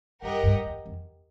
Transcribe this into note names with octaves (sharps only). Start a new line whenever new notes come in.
G2 G4 A#4 D#5 F#5
G2
F2
F2